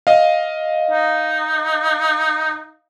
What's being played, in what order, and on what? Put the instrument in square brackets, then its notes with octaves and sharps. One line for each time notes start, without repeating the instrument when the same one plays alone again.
[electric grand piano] D#5 F5
[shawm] D#4